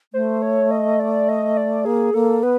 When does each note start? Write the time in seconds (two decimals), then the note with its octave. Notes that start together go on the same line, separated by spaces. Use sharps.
0.13 A3 C5
0.42 C#5
0.71 D#5
1.00 D5
1.29 D#5
1.57 D5
1.85 A#3 G#4
2.14 A#3 A4
2.43 B3 B4